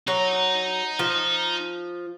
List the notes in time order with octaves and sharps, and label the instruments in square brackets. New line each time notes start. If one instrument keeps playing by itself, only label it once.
[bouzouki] F#3 [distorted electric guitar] D#4 A#5
[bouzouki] F3